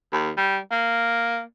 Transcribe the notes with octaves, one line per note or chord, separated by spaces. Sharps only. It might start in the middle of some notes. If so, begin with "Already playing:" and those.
D#2
G3
A#3